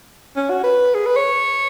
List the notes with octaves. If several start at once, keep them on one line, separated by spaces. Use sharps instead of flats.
C#4
F#4
B4
G#4
B4
C#5